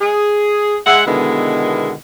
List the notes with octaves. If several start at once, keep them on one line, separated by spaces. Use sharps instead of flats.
G#4
G#3 E5 F#5
B2 D3 D#3 G#3 B3 E4